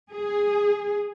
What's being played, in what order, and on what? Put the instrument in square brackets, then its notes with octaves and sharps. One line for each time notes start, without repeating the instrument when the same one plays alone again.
[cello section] G#4